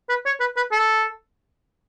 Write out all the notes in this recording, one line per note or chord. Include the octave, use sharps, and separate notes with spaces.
B4
C#5
B4
B4
A4